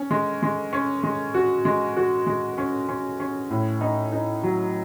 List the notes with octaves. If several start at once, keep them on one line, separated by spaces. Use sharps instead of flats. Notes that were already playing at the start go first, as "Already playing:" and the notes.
Already playing: C#4
G#3
G#3
C#4
G#3
F#4
G#3
F#4
G#3
C#4
C#4
C#4
A2
D#4
D#4
F#3